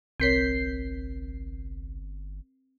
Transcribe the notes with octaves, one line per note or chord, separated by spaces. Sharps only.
G1 C2 C4 A#4 C#5 G6 B6 C7